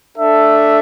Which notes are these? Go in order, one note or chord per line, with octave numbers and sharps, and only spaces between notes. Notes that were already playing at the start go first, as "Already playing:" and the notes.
D4 A4 E5